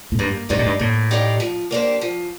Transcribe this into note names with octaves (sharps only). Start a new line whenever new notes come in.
A2
G2 A#3
G2 D#4 G4 D5 F5
A2
G2
A2 A#3
D#4 G4 D5 F5
F3
A#3 D4 G4 C5
F3